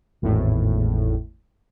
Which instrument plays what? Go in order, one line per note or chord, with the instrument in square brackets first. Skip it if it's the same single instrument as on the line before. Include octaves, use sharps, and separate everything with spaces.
[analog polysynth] G#1 E2 A2